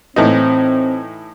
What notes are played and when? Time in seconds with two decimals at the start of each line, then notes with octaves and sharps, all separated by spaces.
0.16 A2 E3 C4 D#4